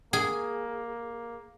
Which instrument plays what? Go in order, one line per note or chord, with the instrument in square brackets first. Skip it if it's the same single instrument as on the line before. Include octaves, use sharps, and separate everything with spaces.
[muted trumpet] A#3 [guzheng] G#4